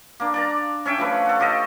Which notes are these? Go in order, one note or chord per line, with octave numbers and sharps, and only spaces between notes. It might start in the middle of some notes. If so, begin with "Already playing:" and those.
A#3 D4
D5 A5 A#5
C#4 C#5 E5 G5
F3 A3 B4
A4 F#5
F4 G4 A4 D#5